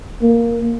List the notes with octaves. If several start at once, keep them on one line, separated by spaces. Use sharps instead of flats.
A#3